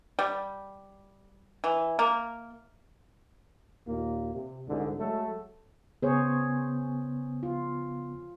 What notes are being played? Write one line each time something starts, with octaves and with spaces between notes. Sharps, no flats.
G3
E3
A#3
D#2 A#2 A#3
C3
C2 G#2 D3
F#3 G#3 A3 A4
C#3 B3 G#4 C5 C#5
F4